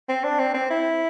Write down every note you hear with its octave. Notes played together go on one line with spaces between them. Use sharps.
C4
D4
C4
C4
E4